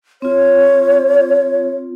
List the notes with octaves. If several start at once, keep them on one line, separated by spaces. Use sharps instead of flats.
C4 F4 C#5